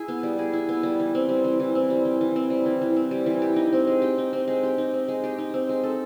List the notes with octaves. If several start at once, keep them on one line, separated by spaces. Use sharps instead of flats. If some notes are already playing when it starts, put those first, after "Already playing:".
Already playing: E4 G#4
B3
G3
G#4
E4
B3
G3
E3
C4
G3
E3
E3
C4
G3
E3
E3
C4
G3
E3
E3
C4
G3
E3
G4
D#4
C4
G#3
G4
D#4
C4
G#3
G4
D#4
C4
G#3
G4
D#4
C4
G#3
A4